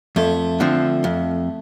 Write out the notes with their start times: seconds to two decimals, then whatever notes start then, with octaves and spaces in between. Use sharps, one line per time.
0.16 F2 A3
0.60 D3 F3 C4
1.04 F2